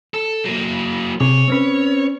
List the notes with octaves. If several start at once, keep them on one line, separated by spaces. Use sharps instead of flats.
A4
F#3 A#3
C3 G#4 C#5
C4 C#4 B4